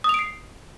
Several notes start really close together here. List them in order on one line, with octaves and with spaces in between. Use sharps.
D#6 F7 D7 C7